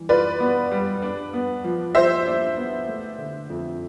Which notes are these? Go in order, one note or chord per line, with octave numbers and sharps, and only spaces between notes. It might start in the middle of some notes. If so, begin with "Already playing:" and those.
Already playing: E3 G3
F4 B4 D5
B3
G3
D4
B3
F3
F3 C5 E5
D4
B3
A3
D3
F2